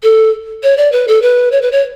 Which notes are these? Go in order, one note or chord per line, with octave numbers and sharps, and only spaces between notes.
A4
C#5
D5
B4
A4
B4
C#5
B4
C#5